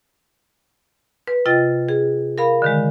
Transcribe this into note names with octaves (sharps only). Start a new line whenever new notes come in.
B4
C3 F4 D#5 G5 A6
G#4
A#4 F5 B5
D3 D#3 G#3